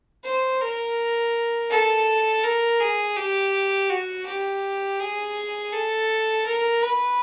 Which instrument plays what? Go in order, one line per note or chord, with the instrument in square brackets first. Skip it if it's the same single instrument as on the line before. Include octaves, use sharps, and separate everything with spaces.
[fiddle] C5
A#4
A4
A#4
G#4
G4
F#4
G4
G#4
A4
A#4
B4